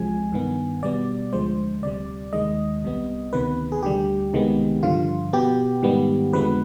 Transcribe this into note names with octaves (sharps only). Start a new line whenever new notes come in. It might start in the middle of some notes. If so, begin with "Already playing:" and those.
Already playing: C2 C3 F3 G#3 G#5
G2 D#3 B3
B2 G3 B3 D5
D2 D3 F3 G#3 C5
D2 C3 G3 D5
D#2 D#3 G#3 D#5
C2 C3 G3 B3
D2 C3 D#3 B3 B4
G#4
D2 D3 G3 G4
C2 C3 D#3 G#3 B3
G2 D3 F3 F4
B2 B3 G4
G#2 D#3 G3 B3
F2 D3 F3 G#3 B3 B4